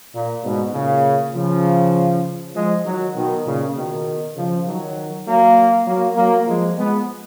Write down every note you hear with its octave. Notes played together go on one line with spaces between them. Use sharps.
A#2
G#2 B2
A#2 C#3
C#3 F3
F3 G#3
D#3 F#3
B2 D#3
A#2 C#3
B2 D#3
C#3 F3
D#3 F#3
F#3 A#3
F#3 A#3
F#3 A#3
F3 G#3
G#3 B3